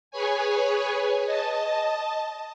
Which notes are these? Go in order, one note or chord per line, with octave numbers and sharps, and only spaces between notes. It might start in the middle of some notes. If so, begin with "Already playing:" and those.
G#4 B4 C#5 G#5
D#5 A5